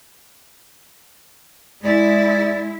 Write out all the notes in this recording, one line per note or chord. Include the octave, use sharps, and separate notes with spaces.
G#3 E4 D5